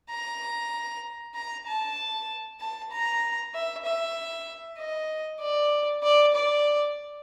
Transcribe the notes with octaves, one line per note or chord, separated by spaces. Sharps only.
A#5
A#5
A5
A5
A#5
E5
E5
D#5
D5
D5
D5